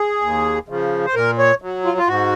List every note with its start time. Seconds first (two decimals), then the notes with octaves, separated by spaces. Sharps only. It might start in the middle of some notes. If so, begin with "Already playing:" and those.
Already playing: G#4
0.22 D#2
0.69 C#3 F3
1.05 C5
1.15 A#2 A#4
1.38 C#5
1.62 F#3
1.85 F4
1.98 F4
2.08 G#2 F#4